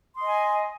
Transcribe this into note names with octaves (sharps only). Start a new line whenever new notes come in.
D#5 G#5 C6 D#6